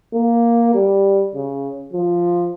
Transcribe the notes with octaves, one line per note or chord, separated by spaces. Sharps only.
A#3
G3
C#3
F3